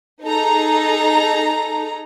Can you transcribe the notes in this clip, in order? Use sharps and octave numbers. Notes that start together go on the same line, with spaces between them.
D#4 G#4 A4 A#5